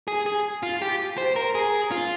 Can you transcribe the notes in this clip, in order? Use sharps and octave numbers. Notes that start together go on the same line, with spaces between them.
G#4
G#4
F4
G4
C5
A#4
G#4
F4